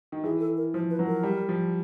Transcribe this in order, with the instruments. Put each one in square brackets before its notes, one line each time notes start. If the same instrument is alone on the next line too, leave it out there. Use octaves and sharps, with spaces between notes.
[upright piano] D#3
[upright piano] E3 [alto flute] G#4
[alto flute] A4
A#4
[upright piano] F3 [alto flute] C5
[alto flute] B4
[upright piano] F#3
[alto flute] A#4
[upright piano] G3
F3